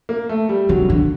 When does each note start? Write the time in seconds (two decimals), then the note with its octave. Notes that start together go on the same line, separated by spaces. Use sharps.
0.09 A#3
0.29 A3
0.49 G3
0.69 D3 F#3
0.88 D3 D#3